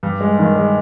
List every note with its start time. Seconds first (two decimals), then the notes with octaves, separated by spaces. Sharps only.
0.03 G2
0.21 G#3
0.39 D#3
0.56 G#3